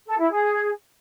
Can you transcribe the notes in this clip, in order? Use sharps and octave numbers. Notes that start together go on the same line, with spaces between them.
A4
E4
G#4